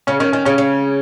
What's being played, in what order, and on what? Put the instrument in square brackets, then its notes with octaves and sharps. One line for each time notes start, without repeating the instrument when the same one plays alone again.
[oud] C#3 [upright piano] C#4
[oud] D#3 [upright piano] C#4
[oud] D#3 [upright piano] C#4
[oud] C#3 [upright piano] C#4
[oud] C#3